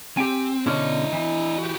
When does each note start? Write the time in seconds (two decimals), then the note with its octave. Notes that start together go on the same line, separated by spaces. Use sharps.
0.17 C4 G4 G5 G#5
0.66 B2 D3 C#4 E4 D#5
1.13 E3
1.58 F#4 G4